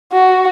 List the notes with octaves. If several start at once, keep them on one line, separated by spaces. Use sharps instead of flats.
F#4